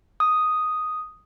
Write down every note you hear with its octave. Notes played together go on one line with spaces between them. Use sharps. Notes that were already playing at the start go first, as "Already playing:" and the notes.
D#6